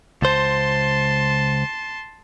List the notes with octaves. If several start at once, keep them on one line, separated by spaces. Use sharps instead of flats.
C#2 C5 A5 C6